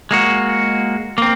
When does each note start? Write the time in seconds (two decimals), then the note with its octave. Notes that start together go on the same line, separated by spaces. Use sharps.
0.11 G#3 A#3 F#4
1.18 A#3 C4